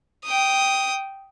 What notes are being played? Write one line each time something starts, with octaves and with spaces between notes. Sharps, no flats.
G5 D#6